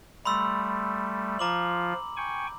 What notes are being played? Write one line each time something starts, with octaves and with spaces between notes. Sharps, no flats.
G3 A3 B5 C6 E6
F3 F4 A#5 D6 F#7
G5 G#5 C#6